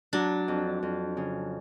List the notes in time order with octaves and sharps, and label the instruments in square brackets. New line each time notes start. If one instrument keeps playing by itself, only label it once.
[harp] F#3 [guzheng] D4
[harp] F2
F2
C#3